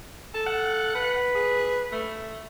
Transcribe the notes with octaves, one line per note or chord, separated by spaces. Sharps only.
A4 A5
F#5
B4
G#4
A3